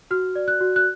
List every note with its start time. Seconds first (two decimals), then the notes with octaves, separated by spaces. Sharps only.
0.11 F#4 F6
0.35 D5
0.48 F#6
0.61 F#4
0.76 F#6